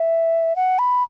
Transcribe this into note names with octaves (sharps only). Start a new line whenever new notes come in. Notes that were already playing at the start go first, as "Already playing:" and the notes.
Already playing: E5
F#5
B5